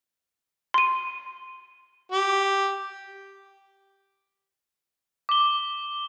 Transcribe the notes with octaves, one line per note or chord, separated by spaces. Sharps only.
C6 D#7
G4
D6 G7